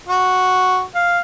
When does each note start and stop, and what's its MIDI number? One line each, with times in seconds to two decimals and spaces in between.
0.08 0.81 66
0.95 1.20 77